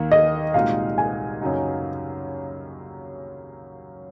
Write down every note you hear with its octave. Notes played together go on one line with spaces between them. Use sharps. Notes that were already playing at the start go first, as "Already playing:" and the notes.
Already playing: D#2 D#3 A#3
D#5
C2 A#2 G#3 D#4 F#4 F5
G#5
F#2 C#3 F#3 A#3 D#4